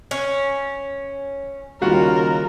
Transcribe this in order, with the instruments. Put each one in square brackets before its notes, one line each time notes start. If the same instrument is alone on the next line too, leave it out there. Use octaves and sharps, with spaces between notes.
[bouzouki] C#4
[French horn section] D#2 C#3 [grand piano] G3 F4 F#4 [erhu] A#4